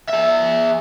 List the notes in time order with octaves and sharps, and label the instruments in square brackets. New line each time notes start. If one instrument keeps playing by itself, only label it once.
[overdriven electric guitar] G#4 E5